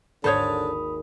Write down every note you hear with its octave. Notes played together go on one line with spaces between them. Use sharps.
G#1 D#2 D3 A4 C5 C#5 B5 D#6